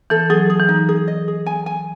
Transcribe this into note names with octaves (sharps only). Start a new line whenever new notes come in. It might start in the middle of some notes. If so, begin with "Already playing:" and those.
E3 A4
F#3 G#4
G#4
E3
D#4
G#4
D#5
G#4
G#5
G#5